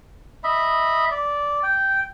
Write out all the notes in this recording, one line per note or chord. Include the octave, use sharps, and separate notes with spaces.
D#5 E5 B5
D5
G5